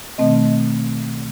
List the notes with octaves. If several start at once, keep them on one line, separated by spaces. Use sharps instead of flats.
B2 D#3 A3 C4 D#5